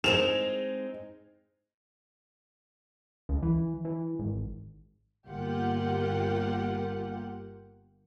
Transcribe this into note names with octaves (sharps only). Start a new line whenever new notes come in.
G#3 C4 D#4 E7 F7
C#2
E3
E3
G#1
G1 A#3 F4 G4 F#5